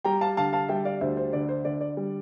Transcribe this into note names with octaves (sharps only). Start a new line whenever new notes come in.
G3 G5 A#5
F5 A5
D3 F5 A5
F5 A5
G3 E5 G5
D5 F5
D2 C5 E5
C5
D3 D5
C5
D3 D5
D5
G3